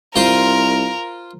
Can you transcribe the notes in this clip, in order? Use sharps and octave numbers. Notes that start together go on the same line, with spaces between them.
C2 F4 A#4 C5